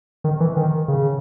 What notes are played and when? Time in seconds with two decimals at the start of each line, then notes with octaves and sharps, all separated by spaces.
0.24 D#3
0.40 E3
0.57 D#3
0.88 C#3